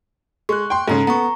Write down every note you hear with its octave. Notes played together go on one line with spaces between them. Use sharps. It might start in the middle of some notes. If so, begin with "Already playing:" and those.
G#3 C#6 F#6
G5 C6
G#2 C#3 A4 A#5
B3 A#5 C#6